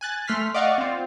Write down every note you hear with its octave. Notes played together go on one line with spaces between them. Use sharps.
G#5 F#6 A6
A3 C6 F6 B6
D5 D#5 F5 F#5 C#6 D6
C4 F4